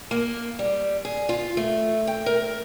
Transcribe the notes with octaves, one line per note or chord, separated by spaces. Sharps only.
A#3
G3
G#4
F4
A3
G5
A#4